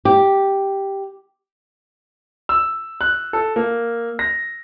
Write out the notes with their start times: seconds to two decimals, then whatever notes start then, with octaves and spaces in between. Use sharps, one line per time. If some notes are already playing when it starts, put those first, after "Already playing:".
0.05 G4
2.49 E6
3.01 F#6
3.33 A4
3.56 A#3
4.19 A#6